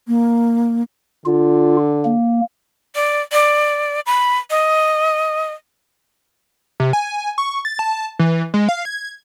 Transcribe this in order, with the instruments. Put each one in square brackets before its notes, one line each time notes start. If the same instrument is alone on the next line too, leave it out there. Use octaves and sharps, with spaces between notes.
[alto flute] A#3
[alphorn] D3 [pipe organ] F4
[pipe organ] A#3
[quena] D5
D5
B5
D#5
[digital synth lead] C3
G#5
C#6
A6
A5
E3
G#3
F5
G#6